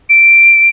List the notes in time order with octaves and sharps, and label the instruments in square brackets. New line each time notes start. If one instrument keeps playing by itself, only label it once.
[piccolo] D7